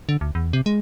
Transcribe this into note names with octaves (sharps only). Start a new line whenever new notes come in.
D3
D2
E2
C3
G#3